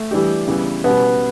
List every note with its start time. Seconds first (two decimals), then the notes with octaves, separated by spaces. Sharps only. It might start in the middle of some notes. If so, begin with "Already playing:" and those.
Already playing: A3
0.11 E3 G3 D4 G4
0.48 C#3 E3 G3 B3
0.84 B2 G3 B3 C#4